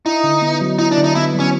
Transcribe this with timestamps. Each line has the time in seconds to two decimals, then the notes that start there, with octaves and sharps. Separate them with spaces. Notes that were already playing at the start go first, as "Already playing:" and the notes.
0.06 D#4 E4
0.24 D3
0.42 B3
0.61 F#3
0.79 D#4 E4
0.91 D4
0.97 D3
1.04 D#4
1.15 B3 E4
1.34 F#3
1.40 C#4